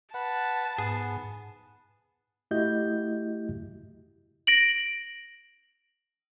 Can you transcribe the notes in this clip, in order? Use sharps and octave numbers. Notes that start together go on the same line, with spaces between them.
B4 F#5 A5
G#2 B3 G#4
A3 E4 F#4 G4 D#5 G6
A#6 D7 F#7